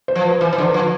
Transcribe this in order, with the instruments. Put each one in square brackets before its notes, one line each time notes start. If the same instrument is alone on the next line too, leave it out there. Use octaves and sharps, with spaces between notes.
[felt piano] C5
[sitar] F3
[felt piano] B4
[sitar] E3 [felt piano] C5
[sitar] E3
D3
[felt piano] B4
[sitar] F3